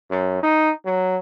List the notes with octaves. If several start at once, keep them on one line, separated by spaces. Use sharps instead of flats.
F#2
D#4
F#3